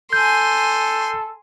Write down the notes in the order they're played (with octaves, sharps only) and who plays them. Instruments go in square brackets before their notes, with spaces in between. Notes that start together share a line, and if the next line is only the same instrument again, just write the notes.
[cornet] A4 [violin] G#5 C6 [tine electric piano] G6